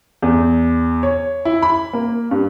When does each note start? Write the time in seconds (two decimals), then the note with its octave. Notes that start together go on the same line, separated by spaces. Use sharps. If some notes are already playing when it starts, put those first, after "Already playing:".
0.22 E2
1.03 C#5
1.45 E4
1.62 B5
1.93 A#3
2.31 G2